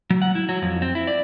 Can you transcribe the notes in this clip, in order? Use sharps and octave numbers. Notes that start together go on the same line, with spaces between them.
F#3
F#5
E4
F#3
F2
C4
E4
D5